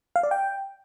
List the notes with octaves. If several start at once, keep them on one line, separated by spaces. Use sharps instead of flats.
F5
D5
G5